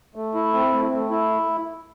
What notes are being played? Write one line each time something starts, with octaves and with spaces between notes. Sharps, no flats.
A3
E4
C4
A3
A3
E4